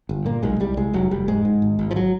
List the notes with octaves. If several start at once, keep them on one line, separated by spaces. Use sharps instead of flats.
G1
A#2 A#3
B1 G#3
C2 G3
C2 G#3
F1 F#3
F1 G3
G#2 G#3
G#2
G#1
G#1
F3
F#3